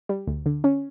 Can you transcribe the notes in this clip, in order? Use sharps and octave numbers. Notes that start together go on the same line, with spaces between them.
G3
D2
D3
C#4